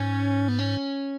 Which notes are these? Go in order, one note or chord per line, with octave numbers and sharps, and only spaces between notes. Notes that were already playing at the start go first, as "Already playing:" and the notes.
Already playing: G#2 C#4
B3
C#4